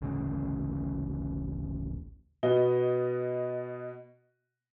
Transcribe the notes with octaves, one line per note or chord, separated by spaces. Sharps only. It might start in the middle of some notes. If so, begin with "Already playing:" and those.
D1 A1 C#3
B2 B3 F#4 D#5 G7